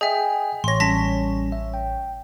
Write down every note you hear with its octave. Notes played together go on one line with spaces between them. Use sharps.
G#4 D#5 E5 G5 G#5
A1 C#5 C6 A#6
G3 C#4 A5 A#6 B6
E5
G5